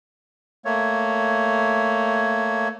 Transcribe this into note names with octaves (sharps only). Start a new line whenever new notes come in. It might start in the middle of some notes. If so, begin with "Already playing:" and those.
A3 A#3 C#5